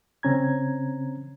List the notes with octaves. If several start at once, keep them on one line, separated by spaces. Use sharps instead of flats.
C#3 C4 C#4 A#5 G#6